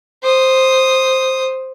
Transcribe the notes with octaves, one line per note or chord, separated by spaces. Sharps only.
C5 D#6